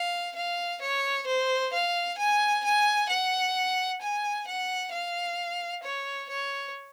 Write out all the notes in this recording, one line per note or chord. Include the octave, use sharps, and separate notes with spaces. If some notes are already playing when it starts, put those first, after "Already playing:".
Already playing: F5
F5
C#5
C5
F5
G#5
G#5
F#5
G#5
F#5
F5
C#5
C#5